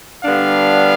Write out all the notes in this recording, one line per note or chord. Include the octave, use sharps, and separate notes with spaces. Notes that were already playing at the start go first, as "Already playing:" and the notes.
D3 G3 B3 D4 F5